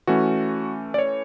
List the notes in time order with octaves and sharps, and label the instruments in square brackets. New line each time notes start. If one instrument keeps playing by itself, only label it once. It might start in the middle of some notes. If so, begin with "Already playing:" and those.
[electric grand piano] E3 A3 C#4 F#4
D5
C#5